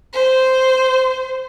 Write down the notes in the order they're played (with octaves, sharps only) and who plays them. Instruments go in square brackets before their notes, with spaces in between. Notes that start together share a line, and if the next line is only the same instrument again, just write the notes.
[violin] C5